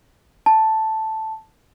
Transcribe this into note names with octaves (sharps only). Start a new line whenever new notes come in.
A5